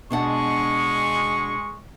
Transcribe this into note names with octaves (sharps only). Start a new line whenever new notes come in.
B2 G#3 D4 F#5 C#6